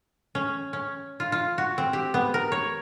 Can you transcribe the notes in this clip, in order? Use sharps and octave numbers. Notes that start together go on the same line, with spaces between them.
C#4
C#4
F4
F4
F#4
C4
G4
B3
A#4
C#5